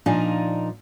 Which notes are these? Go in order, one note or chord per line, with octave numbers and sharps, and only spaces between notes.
A#2 F3 D4 D#4 A#4 G#5